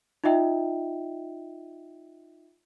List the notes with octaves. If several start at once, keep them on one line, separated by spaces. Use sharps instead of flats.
D#4 F4 D#5 E5 G5